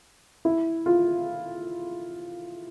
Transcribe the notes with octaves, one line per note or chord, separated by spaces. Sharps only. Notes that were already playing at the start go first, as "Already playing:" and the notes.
E4
F4